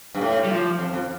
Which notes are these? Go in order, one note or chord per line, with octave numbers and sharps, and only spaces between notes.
G2
A2
G3
F3
F2
F2